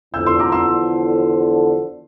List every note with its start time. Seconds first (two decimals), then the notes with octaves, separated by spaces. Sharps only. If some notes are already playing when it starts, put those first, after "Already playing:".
0.14 E2 D3 F3 E6 G6
0.26 C6 E6
0.39 A#5 D6
0.52 C6 E6